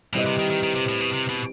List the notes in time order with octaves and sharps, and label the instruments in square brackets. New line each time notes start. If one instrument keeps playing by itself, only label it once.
[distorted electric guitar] B2 [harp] G3 C4 E4 B4 D#5
[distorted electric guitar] C3
D#3
D#3
D#3
C3
A2
B2
C3
B2